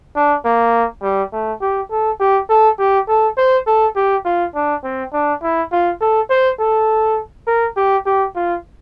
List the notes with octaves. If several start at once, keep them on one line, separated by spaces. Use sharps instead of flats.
D4
A#3
G3
A3
G4
A4
G4
A4
G4
A4
C5
A4
G4
F4
D4
C4
D4
E4
F4
A4
C5
A4
A#4
G4
G4
F4